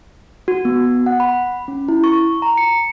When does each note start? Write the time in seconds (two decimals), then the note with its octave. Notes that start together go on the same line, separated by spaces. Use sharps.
0.48 F#4
0.65 B3
1.06 F#5
1.20 B5
1.68 C#4
1.89 E4
2.04 C#6
2.42 A#5
2.58 C#7